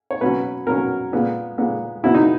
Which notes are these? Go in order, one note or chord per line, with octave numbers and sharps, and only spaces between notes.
C#5
B2 F#3 C#4 B4
B2 F#3 C#4 A#4
A#2 G#3 B3
A#2 G#3 B3
B2 F#3 B3 E4
D#4